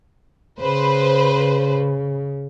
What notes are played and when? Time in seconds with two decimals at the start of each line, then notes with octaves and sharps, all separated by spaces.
0.61 C#3 B4 C5